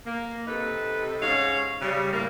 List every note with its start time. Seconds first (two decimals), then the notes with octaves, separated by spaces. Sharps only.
0.06 A#3
0.47 C3 D#4 A4 B4
1.22 G#2 G#3 C#4 C#5 F5
1.81 C#3 G3
2.13 A2 A#3